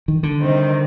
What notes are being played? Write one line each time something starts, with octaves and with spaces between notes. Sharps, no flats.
D#3
D3
C3 D#3 G3 C4 D#4